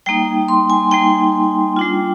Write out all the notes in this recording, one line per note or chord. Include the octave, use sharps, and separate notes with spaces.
G3 A#3 D#4 G5
C6
G#5
G3 A#3 D#4 G5
G3 D4 F4